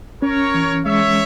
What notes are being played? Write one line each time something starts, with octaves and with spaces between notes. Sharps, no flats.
C#4 A#4 C#5
E3
G#3 C#5 E5